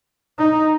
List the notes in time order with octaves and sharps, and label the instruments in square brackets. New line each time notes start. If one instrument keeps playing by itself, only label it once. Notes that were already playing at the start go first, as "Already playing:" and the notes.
[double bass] D#4